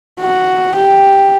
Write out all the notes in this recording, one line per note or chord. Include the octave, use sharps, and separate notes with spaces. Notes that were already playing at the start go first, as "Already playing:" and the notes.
F#4
G4